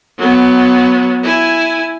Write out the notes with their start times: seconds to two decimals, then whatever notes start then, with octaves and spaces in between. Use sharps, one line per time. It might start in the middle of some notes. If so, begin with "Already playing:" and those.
0.18 F#3 B3
1.23 E4 G#5